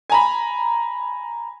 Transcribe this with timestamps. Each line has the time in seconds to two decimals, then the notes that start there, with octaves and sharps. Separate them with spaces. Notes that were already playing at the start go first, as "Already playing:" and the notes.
0.10 G#5 A#5 B5